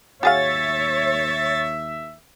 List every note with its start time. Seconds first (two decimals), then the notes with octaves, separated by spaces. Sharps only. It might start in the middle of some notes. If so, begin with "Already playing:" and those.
0.23 D#2 F#4 G#4 C#5 E5 F5 A6